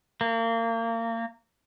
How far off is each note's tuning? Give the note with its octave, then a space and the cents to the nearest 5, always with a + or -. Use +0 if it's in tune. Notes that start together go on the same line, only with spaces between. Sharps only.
A#3 -30